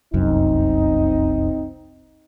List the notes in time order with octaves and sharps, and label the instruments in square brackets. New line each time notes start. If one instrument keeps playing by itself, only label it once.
[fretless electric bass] F1 C2 F#2 [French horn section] C4 D#4